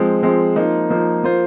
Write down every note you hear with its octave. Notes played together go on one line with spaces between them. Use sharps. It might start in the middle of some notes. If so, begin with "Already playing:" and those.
Already playing: F3 G#3 C4
F3 G#3 C4
F3 A#3 D#4
F3 A#3 D#4
F3 A#3 F4 C5